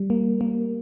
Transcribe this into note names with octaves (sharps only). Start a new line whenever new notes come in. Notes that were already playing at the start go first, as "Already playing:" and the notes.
Already playing: G3
A#3
A#3